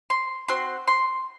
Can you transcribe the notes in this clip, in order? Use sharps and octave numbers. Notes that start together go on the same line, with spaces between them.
C6
C4 F#4 C6
C6